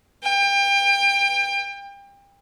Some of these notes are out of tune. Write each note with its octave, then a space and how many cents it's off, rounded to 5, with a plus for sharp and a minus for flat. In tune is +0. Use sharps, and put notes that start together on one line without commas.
G5 +30